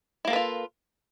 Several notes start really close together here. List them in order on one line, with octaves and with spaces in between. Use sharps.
E4 A#3 A4 B4 F4